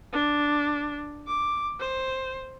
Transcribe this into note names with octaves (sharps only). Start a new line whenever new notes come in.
D4
D6
C5